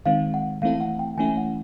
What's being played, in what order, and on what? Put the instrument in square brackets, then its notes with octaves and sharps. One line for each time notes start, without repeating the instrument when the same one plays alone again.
[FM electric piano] D#3 G#3 C4 [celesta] F5
[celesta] F#5
[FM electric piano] E3 A3 C4 E4 A4 [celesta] F5
[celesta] F#5
G5
[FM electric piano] E3 A3 C#4 E4 [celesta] G#5
[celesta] F#5